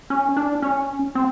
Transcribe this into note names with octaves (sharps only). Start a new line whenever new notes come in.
C#4
D4
C#4
C4